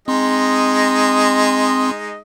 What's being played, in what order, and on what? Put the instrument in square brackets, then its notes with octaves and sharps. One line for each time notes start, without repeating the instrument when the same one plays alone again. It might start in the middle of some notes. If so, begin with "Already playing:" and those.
[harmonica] G#3 D#4 D#5 [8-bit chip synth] C4 C6